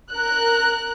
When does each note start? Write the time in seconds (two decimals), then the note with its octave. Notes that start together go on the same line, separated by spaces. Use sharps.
0.10 A#4 F#6